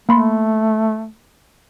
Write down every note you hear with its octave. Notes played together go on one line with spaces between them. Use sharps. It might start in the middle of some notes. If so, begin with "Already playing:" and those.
A3 A#3 B5 C6